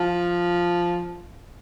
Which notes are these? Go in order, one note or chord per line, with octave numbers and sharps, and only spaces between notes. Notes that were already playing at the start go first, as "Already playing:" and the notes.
Already playing: F3